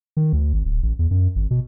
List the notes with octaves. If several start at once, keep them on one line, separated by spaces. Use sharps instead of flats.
D#3
D2
G#1
D1
A1
E2
F#2
G#1
B2